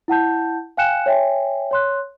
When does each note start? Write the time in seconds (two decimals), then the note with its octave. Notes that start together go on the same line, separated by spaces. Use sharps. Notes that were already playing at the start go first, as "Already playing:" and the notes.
0.08 E4 F#5 A5 G6
0.77 F5 G5 G#5 F#6 C#7 E7
1.06 C#5 E5 G5 G#5
1.71 C#5 C6 F#6